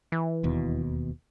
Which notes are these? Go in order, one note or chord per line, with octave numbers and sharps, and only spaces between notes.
E3
E1 D#2 B2